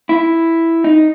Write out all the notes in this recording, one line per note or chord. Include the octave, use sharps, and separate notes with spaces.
E4
D#4